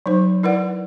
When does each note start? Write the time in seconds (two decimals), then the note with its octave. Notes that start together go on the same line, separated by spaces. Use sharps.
0.06 F#3 D#4 C5
0.43 E4 A#4 B4 D5 F#5